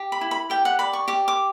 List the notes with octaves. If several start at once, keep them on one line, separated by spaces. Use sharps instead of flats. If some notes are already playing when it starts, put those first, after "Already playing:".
Already playing: G4
B5
E4
B5
G4 G5
F#5
D5 B5
C#6
G4 D6
D6